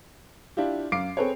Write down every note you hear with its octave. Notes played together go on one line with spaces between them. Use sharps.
D4 E4 F4 G4
F#2 F5 D6 C7 D7
C4 G#4 A4 B4 C#5